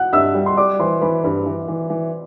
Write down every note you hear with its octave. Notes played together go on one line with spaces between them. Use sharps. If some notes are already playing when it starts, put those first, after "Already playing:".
Already playing: F#5 F#6
G2 E5 E6
G3
C6
G3 D5 D6
E3 C5 C6
E3 B4 B5
G2 B4 B5
E3
E3
E3